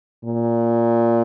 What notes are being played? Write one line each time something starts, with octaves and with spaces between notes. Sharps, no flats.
A#2